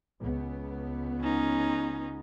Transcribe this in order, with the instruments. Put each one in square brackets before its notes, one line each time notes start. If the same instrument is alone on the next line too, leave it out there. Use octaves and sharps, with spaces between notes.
[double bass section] C#2 B3
[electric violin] C#4 D#4